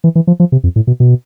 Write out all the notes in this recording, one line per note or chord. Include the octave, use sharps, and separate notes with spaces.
E3
E3
F3
F3
C3
F2
A2
B2
B2